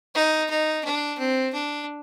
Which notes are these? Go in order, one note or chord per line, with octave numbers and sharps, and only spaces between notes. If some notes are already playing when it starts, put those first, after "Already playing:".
D#4
D#4
D4
C4
D4